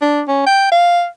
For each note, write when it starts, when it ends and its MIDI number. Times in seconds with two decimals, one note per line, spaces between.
0.02 0.22 62
0.28 0.45 61
0.46 0.68 79
0.72 1.06 77